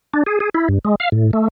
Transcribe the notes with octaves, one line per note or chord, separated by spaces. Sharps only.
D4
G#4
G#4
E4
G2
G#3
F5
A2
A3